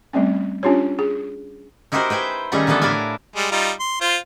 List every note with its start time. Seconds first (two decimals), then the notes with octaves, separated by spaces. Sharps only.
0.13 G3 A3 C4 C#4
0.63 C#4 D4 F4 G4 C#5
0.99 G#4
1.92 D#4 E4 F#4 G4 A#4 C5
2.10 B4 C5 G5 G#5
2.52 D#3 G3 A3 C#4 G#4 A#5
2.67 D3 E3 G3 B3 A4 B4
2.82 A2 D4 E4 A#4 F5 G#5
3.36 G3 G#3
3.51 G3 D#4 F4
3.80 C6
4.01 F4 C5